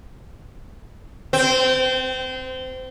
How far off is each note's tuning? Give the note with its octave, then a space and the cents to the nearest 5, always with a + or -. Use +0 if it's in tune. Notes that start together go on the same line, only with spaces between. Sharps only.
C4 -25